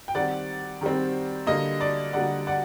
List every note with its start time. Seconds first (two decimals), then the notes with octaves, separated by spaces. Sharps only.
0.08 G5
0.15 D#3 G3 C4 D5 F#5
0.81 D#3 G3 C4
1.47 D3 G3 A#3 D#5
1.81 D5
2.13 D3 G3 A#3 D5 F#5
2.47 D5 F#5